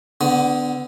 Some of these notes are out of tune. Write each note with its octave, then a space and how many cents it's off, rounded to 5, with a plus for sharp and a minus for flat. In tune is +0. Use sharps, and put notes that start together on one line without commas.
D3 +0 B3 +25